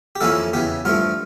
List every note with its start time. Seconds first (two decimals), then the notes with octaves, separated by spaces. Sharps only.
0.16 G4
0.21 F2 E3 A#3 C#4 E4 A4
0.53 E2 C#3 E3 G4
0.85 G2 F3 A3 F4